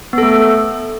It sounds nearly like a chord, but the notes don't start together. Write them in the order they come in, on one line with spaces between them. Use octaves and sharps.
B3 A4 A3